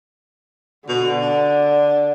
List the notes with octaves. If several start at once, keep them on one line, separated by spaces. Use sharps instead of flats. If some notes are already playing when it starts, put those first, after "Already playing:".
B2 D3
D4